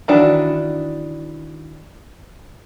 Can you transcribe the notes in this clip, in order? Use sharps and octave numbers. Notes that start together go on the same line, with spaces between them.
D#3 E3 D4 F#4